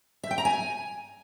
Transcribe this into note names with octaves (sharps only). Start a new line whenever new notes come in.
E5
G5
A#5
G#5